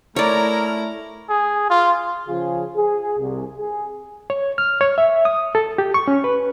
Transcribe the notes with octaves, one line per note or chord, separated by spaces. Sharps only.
A3 E4 A#4 C#5 D5 A#5
G#4
F4
C#3 F3 F4 G#4
G#4
C2
G#4
C#5
F6
C#5
E5
D#6
A4
G4
C#6
C#4
B4